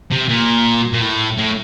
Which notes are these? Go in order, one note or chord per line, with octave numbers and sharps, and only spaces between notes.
C3
A#2
A#2
A2
A2